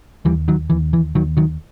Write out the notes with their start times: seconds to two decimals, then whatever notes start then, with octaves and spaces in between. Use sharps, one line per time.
0.25 D#2 E3 G3
0.48 D#3 F#3
0.70 D#2 E3
0.93 E3
1.15 D#2 D#3 F#3
1.37 D#3 F#3